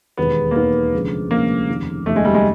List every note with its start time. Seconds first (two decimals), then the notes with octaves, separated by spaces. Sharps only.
0.17 E1 D#2 D#3 G#3 B3
0.51 A#3
0.55 E1 D#2 D#3 G#3 B3
0.93 D2 C3 F3 G#3 C#4
1.31 D2 C3 F3 G#3 A#3 C#4
1.69 F1 D#2 C#3
2.06 F1 D#2 C#3 A3
2.16 G#3
2.25 G3
2.34 G#3